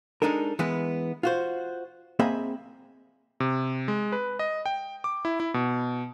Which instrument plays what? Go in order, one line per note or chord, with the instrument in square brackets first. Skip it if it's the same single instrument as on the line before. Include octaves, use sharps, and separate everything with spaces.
[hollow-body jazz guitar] G#3 D4 D#4 A4 A#4
E3 G#3 B3 B4
F4 F#4 C5
A#3 C4 G#4 D#5 E5 B5
[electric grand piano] C3
G#3
B4
D#5
G5
D6
E4
E4
B2